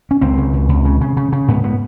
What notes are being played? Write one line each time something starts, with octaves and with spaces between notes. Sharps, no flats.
C#4
C#2 C4
C#3
C#2
C#2
C#3
C#3
C#3
C#3
G#2 B3
B3